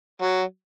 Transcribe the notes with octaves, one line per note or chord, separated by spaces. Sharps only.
F#3